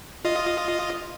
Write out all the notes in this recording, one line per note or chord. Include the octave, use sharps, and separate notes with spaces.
F4 D#5